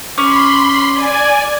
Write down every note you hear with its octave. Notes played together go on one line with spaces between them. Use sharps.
C#4 B5 C6 D6
D5 G#5